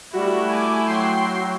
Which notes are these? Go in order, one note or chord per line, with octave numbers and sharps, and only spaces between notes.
G3 A3 E4 F#4
G#5 D6
F#3 G5 C6 C7